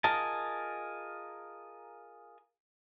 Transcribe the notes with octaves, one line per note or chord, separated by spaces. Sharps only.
F4 G#4 A#4 D#5 A5